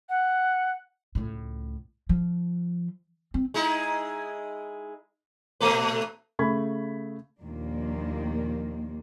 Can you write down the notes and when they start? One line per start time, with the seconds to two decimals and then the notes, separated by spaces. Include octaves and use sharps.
0.09 F#5
1.15 C#2 A2
2.09 F3
3.34 C4
3.54 G#3 D#4 E4
5.60 A#2 A3 B4
6.39 C#3 A3 B5 C#6 G#6
7.42 D#2 A#2 D#3 F3 A#3 D4